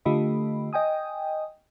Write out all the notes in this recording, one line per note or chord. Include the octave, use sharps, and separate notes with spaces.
D3 A3 F4 G4 D#5 B5
D#5 G5 G#5 D#6